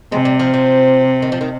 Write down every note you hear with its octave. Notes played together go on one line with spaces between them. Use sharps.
C3 G#3
G3
F3
F3
D#3
F3
D#3